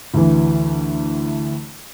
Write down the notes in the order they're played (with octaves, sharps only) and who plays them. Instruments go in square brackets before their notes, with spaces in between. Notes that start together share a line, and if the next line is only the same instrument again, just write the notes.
[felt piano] D2 E3